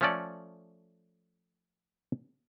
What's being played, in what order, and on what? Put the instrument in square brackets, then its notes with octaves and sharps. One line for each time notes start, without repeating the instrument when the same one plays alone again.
[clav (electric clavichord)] F3 A3 C#4 A4 D5